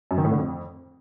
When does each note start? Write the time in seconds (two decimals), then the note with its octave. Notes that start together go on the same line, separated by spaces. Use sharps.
0.11 F#2
0.18 D#3
0.24 A2
0.31 D3
0.38 F2